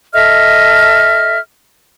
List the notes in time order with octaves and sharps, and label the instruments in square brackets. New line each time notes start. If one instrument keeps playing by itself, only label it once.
[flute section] A4 D#5 E5 F6